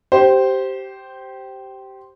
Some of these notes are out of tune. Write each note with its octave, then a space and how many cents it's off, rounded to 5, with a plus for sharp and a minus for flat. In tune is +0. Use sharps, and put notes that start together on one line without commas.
G4 -15 C5 +0